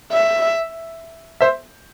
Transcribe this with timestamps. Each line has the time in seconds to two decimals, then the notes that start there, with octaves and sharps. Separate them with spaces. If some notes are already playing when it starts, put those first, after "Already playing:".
0.12 E5
1.41 C5 E5